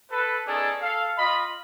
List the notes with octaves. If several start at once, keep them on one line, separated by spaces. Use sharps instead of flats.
A4 B4
B3 C#4 D#4 G#4 A4 D5
A4 F5
F4 D#5 B5